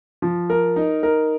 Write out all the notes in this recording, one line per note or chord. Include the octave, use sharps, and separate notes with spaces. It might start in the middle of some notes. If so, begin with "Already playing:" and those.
F3
A#4
D#4
A#4